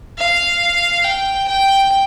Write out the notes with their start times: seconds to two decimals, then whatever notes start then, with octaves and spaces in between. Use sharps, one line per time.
0.18 F5
1.04 G5
1.48 G5